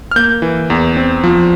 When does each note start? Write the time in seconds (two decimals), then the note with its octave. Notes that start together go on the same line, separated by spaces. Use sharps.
0.11 F6
0.16 A#3 G6
0.42 E3
0.70 E2
0.97 C4
1.24 F3